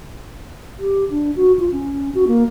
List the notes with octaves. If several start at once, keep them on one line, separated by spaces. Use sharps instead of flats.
G4
D4
F#4
F4
C#4
F#4
A#3